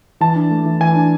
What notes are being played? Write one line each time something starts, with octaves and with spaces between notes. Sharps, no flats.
E3 A5
D4
A3
E3
E3 G#5
D4